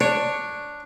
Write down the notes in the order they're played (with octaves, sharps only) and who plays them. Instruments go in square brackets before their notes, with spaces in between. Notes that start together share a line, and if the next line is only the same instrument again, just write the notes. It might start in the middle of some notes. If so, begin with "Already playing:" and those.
[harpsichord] D4 [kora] C#5